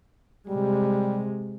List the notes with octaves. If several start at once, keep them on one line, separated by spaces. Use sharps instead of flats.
C3 G3 G#3